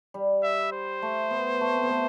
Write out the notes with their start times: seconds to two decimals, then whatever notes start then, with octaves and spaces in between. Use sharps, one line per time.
0.14 G3
0.43 E5
0.72 C5
1.02 A3
1.31 B3
1.61 A3
1.75 C4
1.83 B3
1.90 A3